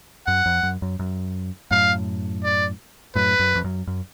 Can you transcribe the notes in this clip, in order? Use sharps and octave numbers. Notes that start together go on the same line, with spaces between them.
F#2 F#5
F2
F#2
F#2
F#2
F#2 A2 F5
D5
F#2 A2 B4
F#2
F2
F#2
F#2